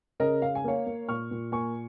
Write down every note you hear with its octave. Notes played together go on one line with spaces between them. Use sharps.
C#3 A#4 D#5
C#3 F5
G#5
A#3 C#5 F5
A#3
A#2 C#6 F6
A#2
A#3 G#5 C#6